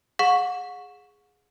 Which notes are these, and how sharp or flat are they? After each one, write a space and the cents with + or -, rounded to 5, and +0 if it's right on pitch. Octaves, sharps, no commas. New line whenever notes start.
G#4 +0 F#5 -35 C#6 +0